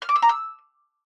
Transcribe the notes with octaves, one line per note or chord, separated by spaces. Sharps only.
F6
D6
E6
A#5
E6